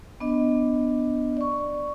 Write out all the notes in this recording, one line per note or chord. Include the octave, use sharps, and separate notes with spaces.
B3 D4 D#5
D5 C#6